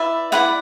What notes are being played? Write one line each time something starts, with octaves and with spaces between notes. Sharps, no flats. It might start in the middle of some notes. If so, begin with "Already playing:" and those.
Already playing: E4 B4 D5 E5
E4 B4 D5 F#5